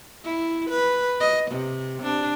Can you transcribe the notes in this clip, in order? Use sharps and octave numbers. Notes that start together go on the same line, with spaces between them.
E4
B4
D#5
C3
D4